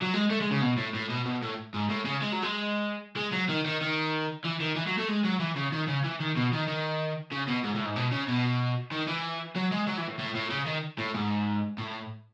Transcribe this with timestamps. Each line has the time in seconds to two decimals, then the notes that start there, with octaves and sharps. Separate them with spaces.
0.02 F#3
0.14 G#3
0.30 A3
0.41 G#3
0.51 C#3
0.62 B2
0.77 A2
0.94 A2
1.10 B2
1.25 B2
1.42 A2
1.74 G#2
1.89 A2
2.05 C#3
2.22 G#3
2.32 F#3
2.43 G#3
3.16 G#3
3.33 F#3
3.49 D#3
3.65 D#3
3.81 D#3
4.45 E3
4.61 D#3
4.76 E3
4.87 F#3
4.98 A3
5.09 G#3
5.25 F#3
5.40 E3
5.56 C#3
5.72 D#3
5.88 C#3
6.04 E3
6.20 D#3
6.36 B2
6.52 D#3
6.67 D#3
7.31 C#3
7.48 B2
7.64 G#2
7.75 A2
7.85 G#2
7.96 B2
8.11 C#3
8.28 B2
8.91 D#3
9.07 E3
9.56 F#3
9.71 G#3
9.87 F#3
9.97 E3
10.07 A2
10.19 A2
10.35 A2
10.50 C#3
10.66 D#3
10.98 A2
11.14 G#2
11.78 A2